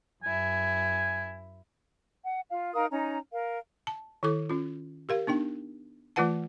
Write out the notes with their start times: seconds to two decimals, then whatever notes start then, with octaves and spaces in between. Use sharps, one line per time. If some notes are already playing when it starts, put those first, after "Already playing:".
0.23 F#2 E4 G#5
2.24 F#5
2.50 F4 F5
2.75 D#4 A#4 F5 D#6
2.91 C#4 D#4 A#5
3.32 A#4 F5
3.87 A5
4.23 D#3 E4 A4 D6
4.50 C#4 F4
5.09 G4 A#4 F5
5.27 B3 D4 D#4 G5
6.16 E3 A3 F4 B4 F#5 A5